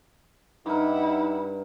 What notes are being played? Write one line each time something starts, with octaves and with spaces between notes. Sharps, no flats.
G2 D#4 E4 A#4 F#5